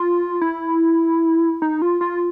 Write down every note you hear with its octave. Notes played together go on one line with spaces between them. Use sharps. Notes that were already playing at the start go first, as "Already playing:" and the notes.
Already playing: F4
E4
D#4
F4
F4